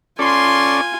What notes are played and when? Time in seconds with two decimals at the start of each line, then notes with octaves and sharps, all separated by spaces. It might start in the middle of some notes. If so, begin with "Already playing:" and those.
0.19 C#4 F4 A4 D5 G#5 C6